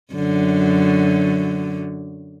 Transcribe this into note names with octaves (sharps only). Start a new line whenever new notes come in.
F#2 D3 F#3